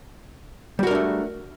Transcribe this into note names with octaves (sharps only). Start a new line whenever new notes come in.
G3 A3 D4 F#4 A#4